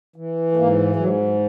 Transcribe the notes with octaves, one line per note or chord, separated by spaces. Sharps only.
E3
A3
G#2 A#3
G#2 F#3